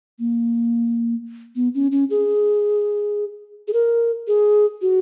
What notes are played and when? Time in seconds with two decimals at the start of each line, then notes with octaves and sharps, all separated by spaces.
0.19 A#3
1.56 B3
1.75 C#4
1.92 C#4
2.10 G#4
3.68 G#4
3.73 A#4
4.28 G#4
4.82 F#4